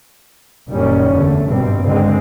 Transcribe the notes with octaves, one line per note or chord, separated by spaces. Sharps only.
F#1 A#2 D#3 G3 C#4
E2 D3 A3
G#1 G2 B2 G3 C4
C#2 D3 G#3 C4